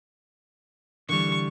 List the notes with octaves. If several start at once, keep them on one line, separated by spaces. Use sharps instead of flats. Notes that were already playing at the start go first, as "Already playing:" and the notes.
D3 E3 G3 C#6